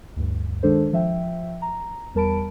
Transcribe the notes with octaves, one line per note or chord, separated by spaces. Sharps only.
D2 G2
D#3 G#3 D4 A4 C5
F3 E5 G5
A#5
E2 G3 A#4 A5 B5 D7